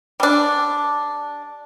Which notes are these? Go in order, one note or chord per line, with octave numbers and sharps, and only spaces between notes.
G3 D4